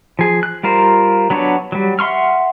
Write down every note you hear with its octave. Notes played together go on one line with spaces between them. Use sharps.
F3 G#4
F#6
G3 F4 A#4 C5
F#3 B3 D4 C#5
F#3 G3
E5 F#5 C6 C#6 F6